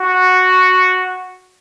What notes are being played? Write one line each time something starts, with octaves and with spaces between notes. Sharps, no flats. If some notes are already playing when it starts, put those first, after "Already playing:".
Already playing: F#4